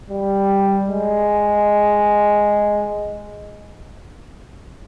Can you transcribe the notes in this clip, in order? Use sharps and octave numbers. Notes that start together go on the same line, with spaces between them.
G3
G#3